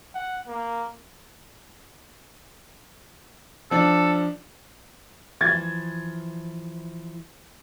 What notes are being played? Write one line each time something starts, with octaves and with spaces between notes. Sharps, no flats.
F#5
A#3
F3 D4 A4
E3 F3 G#6 A6